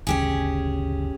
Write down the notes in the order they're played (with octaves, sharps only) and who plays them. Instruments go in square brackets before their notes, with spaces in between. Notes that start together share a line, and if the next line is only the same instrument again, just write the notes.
[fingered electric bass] G1 D2 C#3 [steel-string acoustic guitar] C#4 G4 G#4